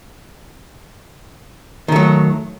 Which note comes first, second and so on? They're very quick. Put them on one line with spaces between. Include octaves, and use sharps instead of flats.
D#3 A3 F#3